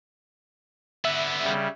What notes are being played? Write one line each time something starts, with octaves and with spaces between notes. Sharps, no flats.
D3 B3 E5
C#3 G3